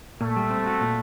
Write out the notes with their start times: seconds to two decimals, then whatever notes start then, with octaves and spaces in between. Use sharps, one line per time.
0.21 A#2 A3
0.36 G3
0.50 C4
0.66 F#4
0.80 A#2